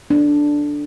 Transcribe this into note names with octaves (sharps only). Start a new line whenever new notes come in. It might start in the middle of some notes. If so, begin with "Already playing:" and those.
D4